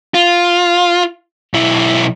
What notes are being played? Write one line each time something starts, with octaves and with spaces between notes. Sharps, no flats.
F4
B1 E4